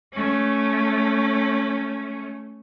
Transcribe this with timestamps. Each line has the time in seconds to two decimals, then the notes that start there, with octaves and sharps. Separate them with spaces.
0.13 A3 C#4